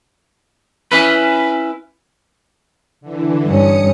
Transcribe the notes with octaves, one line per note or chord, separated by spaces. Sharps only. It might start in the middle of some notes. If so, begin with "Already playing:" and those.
C#4 E4 B4
D3 E3
G2 C#4 D#6 C#7